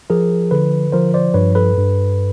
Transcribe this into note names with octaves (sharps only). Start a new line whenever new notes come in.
F3 G#4 A#4
D3 A4 B4
F3 A#4 C5
C5 D5
G2 B4 C#5
A4 B4
G2